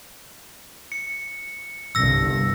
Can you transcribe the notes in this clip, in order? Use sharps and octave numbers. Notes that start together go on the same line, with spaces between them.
C#7
G1 C2 G2 E6 A#6